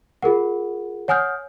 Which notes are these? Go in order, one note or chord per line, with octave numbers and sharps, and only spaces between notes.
F4 G#4 A#4 F#5
C#5 F#5 G#5 D#6 F6 G6